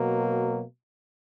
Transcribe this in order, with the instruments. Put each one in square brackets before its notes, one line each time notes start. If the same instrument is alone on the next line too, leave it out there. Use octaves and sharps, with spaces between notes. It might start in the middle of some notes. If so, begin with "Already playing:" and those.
Already playing: [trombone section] B2 F#3 A#3